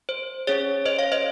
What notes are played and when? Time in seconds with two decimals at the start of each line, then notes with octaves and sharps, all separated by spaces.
0.09 C5
0.47 C#4 G#4 C#5
0.86 C5 D#5
0.99 C#5 F5
1.12 C5 D#5